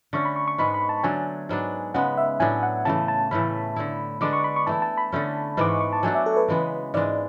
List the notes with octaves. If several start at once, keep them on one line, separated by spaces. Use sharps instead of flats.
D3 A3 C#4 C#6
B5
C#6
C#6
G#2 G#3 B3 B5
B5
A5
D3 F#3 A3 D4 G#5
G#2 F#3 B3 D4
C#3 G#3 B3 F#5
E5
A2 F#3 B3 D4 G#5
F#5
C#3 E3 A3 A5
A5
A2 E3 A3 C#4 B5
D3 A3 E4
D3 G#3 B3 D4 D6
C#6
B5
C#6
E3 A3 E4 A5
A5
B5
D3 A3 C#4
G#2 E3 G#3 B3 D6
C#6
C#6
A5
F#3 A3 D4 F#4 G#5
E5
A4
B4
C#3 E3 G#3 B3
G#2 E3 G#3 D4 D5